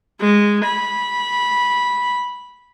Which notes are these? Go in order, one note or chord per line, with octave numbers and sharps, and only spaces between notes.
G#3
B5